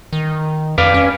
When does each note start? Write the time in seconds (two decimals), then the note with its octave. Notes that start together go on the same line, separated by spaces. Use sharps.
0.13 D#3
0.78 F2 B4 D5 F5
0.94 C#4